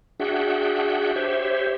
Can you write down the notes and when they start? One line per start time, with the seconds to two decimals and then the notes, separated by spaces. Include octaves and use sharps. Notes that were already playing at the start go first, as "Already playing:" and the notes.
0.20 D4 F#4 G#4 E5 F#5 G5
1.16 G4 C5 C#5 E5